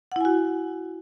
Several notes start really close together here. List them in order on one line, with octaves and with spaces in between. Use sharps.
F#5 E4 G#5 F#4